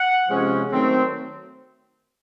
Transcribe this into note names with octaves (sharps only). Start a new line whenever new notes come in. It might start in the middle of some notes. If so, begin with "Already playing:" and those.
Already playing: F#5
C3 F3 G#3 C#4
D#3 F#3 A3 C4